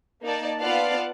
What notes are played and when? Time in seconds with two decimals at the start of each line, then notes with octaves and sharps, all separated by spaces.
0.23 A#3 D#4 D5 A5
0.60 B3 F4 D5 F5 F#5 A5